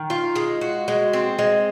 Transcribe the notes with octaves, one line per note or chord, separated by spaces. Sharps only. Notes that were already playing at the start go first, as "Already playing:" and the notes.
Already playing: D#3
F4
G#3
F#4
G#3
C4
G#3